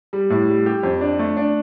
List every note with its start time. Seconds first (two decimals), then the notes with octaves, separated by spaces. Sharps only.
0.13 G3
0.30 A2
0.48 G3
0.66 G4
0.83 F2
1.01 D4
1.19 A3
1.37 D4